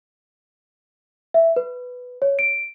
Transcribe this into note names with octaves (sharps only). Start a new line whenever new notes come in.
E5
B4
C#5
D7